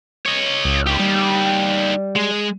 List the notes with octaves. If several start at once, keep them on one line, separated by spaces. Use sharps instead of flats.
C#5 D#5
C#2
D#4 G4
G3
G#3